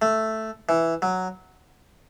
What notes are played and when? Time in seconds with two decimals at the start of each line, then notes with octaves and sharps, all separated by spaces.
0.02 A3
0.69 E3
1.02 F#3